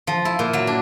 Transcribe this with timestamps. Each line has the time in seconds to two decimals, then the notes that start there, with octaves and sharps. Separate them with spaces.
0.07 F3
0.25 E4
0.39 A#2
0.53 F#3
0.67 D4